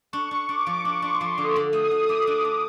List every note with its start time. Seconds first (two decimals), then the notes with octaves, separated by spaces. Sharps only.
0.13 D4 C#6
0.31 D4
0.49 D4 D6
0.67 F3
0.84 D4 C#6
1.02 D4
1.08 C6
1.21 F3
1.32 C6
1.38 D3
1.44 D#6
1.56 D3 D6
1.73 A3 D#6
1.91 D3 D#6
2.09 A3 D6
2.27 D4
2.45 D4